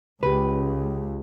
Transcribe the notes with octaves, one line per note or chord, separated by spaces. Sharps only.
C#2 C#3 G4 B4